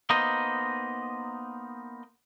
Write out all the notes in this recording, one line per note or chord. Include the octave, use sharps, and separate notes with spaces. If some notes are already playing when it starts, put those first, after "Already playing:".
A#3 B3 D#4 C5 D#5